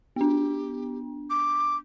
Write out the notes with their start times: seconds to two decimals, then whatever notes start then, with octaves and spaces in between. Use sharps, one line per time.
0.16 B3 D4 G4
1.30 D6